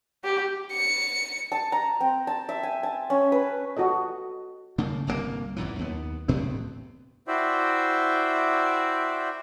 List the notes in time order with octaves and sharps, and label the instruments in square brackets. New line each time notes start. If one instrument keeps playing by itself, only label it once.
[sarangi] G4
[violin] C#7
[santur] A5
A#5
C4
A5
E5
G#5
A5
C#4
B4
[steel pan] F#4 G4 A4 D#5
[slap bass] C#3 A3 A#3
G1 C2 B2 A#3
G#1 F#2 A#2 E3
D#2 B3
D2 A2 B3 C4
[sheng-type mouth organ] E4 F#4 C5 D5 E5 G5